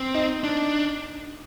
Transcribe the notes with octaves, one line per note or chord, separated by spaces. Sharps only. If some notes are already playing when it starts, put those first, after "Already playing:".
Already playing: C4
D#4
D4